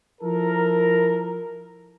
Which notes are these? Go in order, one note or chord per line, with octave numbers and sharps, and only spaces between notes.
F3 E4 A4 A#4